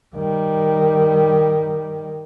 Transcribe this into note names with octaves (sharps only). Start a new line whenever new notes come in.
D#3 G3